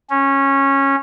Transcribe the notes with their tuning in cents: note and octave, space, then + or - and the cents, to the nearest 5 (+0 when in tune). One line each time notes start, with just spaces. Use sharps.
C#4 -15